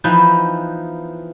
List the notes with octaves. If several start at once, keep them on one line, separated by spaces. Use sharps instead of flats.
E3 F3 B3 D#4 B4 C5